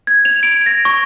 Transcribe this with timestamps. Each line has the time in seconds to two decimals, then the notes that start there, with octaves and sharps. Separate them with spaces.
0.07 G#6
0.25 F7
0.43 D7
0.66 A#6
0.85 C#6